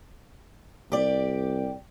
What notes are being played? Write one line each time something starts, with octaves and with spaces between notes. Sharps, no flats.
C2 G4 D5